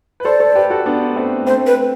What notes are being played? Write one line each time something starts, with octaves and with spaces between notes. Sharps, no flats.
B4
A4 C5 D5
A4 C5
G4 B4
F#4 A4
B3 D4
A3 C4
A3 C4 C5
B4